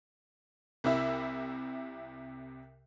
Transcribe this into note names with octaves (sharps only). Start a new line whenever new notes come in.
C2 C3 E4 E5